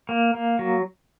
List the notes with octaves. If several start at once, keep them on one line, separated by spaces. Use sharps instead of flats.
A#3
A#3
F#3